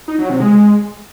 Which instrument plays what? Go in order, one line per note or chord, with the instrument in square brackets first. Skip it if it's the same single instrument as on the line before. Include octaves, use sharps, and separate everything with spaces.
[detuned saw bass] D#4
F#3
C3
G#3